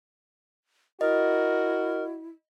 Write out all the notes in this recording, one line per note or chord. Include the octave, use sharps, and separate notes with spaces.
E4 F#4 A#4 D#5